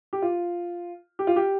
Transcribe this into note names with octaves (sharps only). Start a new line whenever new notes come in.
G4
F4
G4
F4
G4